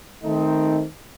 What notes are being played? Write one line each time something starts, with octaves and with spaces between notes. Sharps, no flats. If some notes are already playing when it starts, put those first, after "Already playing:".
D#3 A3 C4 D#4